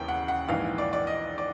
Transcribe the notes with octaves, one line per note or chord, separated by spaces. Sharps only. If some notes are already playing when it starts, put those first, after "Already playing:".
Already playing: E1 D#2 C#3 E3 G5
F#5
F#5
A#1 G#2 E3 F5
D5
D5
D#5
D5